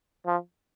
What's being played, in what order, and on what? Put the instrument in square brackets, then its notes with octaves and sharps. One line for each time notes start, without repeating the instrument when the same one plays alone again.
[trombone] F3